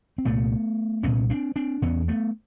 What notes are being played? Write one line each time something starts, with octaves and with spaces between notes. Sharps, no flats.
C4
C2 A#2 A3 B3
C2 A#2 B3 C#4
C4 D4
C4 D4
E2 B2 B3 C#4
A3 B3